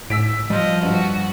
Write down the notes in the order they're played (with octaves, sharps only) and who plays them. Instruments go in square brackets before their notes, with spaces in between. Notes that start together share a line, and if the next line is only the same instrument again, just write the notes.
[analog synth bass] A2 [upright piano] E6 B6 D7
[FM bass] F3 [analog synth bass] G3 [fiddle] D#5
[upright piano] G2 [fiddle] F#4